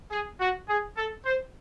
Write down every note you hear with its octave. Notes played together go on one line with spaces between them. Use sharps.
G#4
F#4
G#4
A4
C5